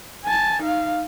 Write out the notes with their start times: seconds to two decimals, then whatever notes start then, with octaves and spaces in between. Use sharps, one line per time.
0.25 G#5 A5
0.63 D#4 F5